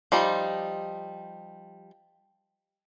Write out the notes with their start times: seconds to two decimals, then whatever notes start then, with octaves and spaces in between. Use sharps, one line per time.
0.12 F3 G3 D#4